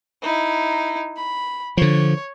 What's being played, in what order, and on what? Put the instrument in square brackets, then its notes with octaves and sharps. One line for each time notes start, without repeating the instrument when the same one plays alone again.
[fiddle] D#4 E4
B5
[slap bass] D3 F3 [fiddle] C#5